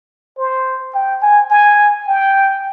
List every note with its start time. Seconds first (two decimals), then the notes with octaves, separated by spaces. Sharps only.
0.38 C5
0.95 G5
1.22 G#5
1.51 G#5
2.08 G5